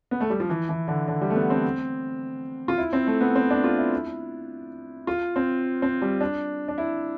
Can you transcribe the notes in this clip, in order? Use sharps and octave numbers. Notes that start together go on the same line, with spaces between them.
B3
A3
G3
F3
E3
E3
D3
D3
G3
A3
B3
C4
F4
E4
C4
A3
B3
C4
D4
F4
E4
F4
C4
C4
G3
D4
D4
E4